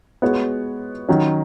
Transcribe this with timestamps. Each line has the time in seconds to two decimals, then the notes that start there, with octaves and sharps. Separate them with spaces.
0.22 G#3 B3 F#4 C#5
1.09 D#3 F#3 C#4